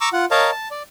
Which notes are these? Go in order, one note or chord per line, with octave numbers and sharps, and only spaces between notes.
A#5 C#6 D6 E6
F4 F#5
A#4 C#5 D#5 F5 A5 A#5
A5
D5